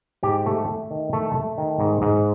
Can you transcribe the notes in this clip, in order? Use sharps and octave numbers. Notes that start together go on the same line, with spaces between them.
G#2 G4
A3
A3
D#3
A3
A3
D#3
G#2
G#2